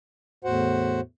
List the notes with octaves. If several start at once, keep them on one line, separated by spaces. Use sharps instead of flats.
E2 A2 F#4 C5 F#5